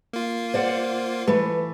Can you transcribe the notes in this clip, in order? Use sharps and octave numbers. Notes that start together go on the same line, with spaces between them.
A#3 F4
C5 D5 F#5
E3 A3 B4